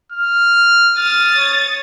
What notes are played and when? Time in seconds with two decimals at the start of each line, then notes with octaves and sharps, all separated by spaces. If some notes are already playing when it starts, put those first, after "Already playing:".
0.12 F6
0.97 D#6 F6 A6
1.35 C#5